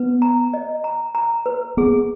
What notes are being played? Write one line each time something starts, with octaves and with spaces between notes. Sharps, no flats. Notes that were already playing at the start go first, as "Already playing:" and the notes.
Already playing: B3 B4
A#5
D#5
A#5
A#5
B4
B3 G#4